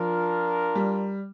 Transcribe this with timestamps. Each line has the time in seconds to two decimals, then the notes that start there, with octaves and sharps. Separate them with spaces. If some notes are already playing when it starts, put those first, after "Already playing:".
Already playing: F3 D4 F4 A#4
0.75 G3